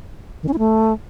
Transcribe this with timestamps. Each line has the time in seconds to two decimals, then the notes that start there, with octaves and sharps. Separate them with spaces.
0.43 D#3
0.48 C#4
0.53 E4
0.59 A3